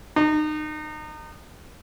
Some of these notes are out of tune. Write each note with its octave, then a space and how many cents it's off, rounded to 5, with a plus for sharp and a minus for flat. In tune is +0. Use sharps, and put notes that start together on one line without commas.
D#4 -30